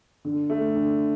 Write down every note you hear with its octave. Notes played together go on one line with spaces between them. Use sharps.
D3
A3
D3